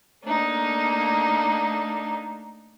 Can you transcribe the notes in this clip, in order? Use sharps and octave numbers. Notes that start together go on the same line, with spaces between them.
A3 A#3 D4 D#4